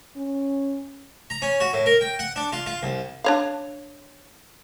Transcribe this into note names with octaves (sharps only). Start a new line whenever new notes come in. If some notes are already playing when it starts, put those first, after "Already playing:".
C#4
A#5
C#4
F#4
A2
A#4
G5
F#5
D4
F4
F4
C2
D4 C#5 F5